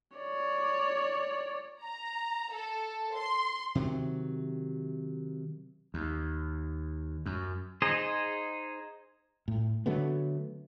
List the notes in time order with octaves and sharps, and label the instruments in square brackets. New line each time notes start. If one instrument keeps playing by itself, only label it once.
[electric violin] C#5 D5
[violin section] A#5
A4
C6
[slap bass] C3 D#3 F#3
D#2
F#2
[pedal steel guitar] D#4 G#4 C5 D#5
[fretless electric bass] A2
D3 F#3 A3 B3